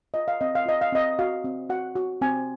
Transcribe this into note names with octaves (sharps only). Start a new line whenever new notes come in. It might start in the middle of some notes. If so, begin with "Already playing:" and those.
F4 D#5
F5
C4 D#5
F5
F4 D#5
F5
C4 D#5
F#4 F5
C4
F#4 F#5
F#4
C4 G#5